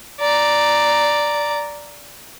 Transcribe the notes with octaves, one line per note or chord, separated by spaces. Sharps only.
D5 A#5